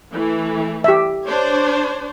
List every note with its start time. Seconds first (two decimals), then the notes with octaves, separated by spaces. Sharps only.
0.13 E3 A3
0.84 G4 E5
1.26 D4 C5 C#5